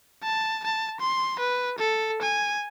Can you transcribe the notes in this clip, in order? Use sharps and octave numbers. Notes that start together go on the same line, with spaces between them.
A5
A5
C6
B4
A4
G#5